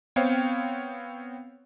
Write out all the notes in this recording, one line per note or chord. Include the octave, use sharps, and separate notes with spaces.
B3 C4 C5 C#5 F5 G5